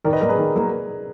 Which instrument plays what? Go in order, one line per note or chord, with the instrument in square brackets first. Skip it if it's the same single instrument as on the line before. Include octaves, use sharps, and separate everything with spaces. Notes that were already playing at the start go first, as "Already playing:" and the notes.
[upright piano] D#3 [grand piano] A#4 D5
[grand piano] B4 D#5
[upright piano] F#3 A#3 [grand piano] A#4 D5
[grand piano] G#4 B4
[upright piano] D#3
F#3 A#3